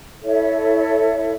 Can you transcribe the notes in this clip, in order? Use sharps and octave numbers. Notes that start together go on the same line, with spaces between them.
E4 A4 C#5 E5